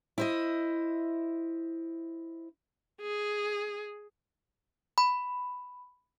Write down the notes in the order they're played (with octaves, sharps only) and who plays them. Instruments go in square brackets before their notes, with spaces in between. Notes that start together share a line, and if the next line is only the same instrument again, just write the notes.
[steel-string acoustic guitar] E4 C5 D#5
[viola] G#4
[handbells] B5